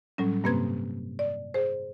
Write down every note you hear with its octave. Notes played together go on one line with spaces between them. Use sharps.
A2 F#3 G3 C#4
G2 C3 A#3 C4 B4 G#6
D5
G#4 C5